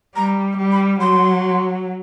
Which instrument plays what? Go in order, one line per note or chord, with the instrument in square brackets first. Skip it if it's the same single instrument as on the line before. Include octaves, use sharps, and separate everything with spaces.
[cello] G3 [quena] A#5
[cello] G3
[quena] B5
[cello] F#3 [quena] C6